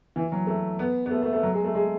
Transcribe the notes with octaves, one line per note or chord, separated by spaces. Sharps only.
E3
F#3
A3
B3
B3
A3
A3
A3
F#3
G#3
A3
G#3